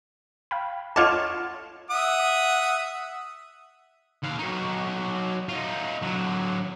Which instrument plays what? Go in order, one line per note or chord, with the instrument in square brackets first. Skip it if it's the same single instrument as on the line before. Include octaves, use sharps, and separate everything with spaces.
[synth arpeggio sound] F5 G5 B5
[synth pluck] F4 C#5 A5 [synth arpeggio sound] A4 D#5 F#5 [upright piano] D6 F6
[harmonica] E5 F#5 D#6
[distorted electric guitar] D#2 F5
F#3 D#4
D#4 F4
D3 F#3